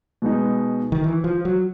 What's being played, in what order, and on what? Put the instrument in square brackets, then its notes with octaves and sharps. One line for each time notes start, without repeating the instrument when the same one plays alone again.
[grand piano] B2 G#3 B3 D#4
[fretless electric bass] D#3
E3
F3
F#3